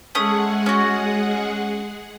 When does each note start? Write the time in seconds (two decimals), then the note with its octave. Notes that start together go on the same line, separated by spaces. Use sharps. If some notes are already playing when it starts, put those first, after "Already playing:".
0.15 G#3 A3 C#4 G#4 F#5 D#6
0.66 C#4 F#4